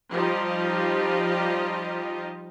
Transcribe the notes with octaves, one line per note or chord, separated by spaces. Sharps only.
F3 G3 D#4 F4 G4 D#5